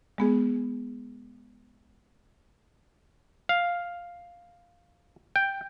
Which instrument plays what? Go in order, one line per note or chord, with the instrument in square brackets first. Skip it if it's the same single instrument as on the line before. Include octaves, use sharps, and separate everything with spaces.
[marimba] G#3 B3 G#4
[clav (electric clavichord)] F5
G5